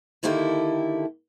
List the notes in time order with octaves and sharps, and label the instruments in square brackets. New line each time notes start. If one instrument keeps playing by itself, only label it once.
[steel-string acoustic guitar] D3 D#3 A#3 E4 G4 A4